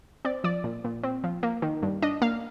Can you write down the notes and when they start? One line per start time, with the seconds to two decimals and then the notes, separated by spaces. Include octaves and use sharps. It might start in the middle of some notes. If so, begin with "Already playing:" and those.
0.25 C4 D5
0.44 F3 D5
0.64 A#2
0.84 A#2
1.03 C4
1.24 F3
1.43 A#3
1.62 D#3
1.82 G2
2.02 D4 D#5
2.22 A#3 F5